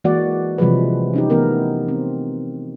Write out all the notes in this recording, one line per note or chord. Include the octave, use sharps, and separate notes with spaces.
E3 G#3 A#3 F#4 D5 F#5
C3 E3 F3 G3 G#3 B4
C#4 D#4 G4
E3 A3 B3 A#4
C4